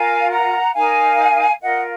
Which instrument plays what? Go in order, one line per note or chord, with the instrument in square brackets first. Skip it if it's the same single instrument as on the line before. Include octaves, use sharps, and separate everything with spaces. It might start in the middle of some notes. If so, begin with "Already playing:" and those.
Already playing: [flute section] F4 A#4 F5 G#5
F#5 A#5
D#4 A#4 F5 G#5
F4 A#4 D#5 F#5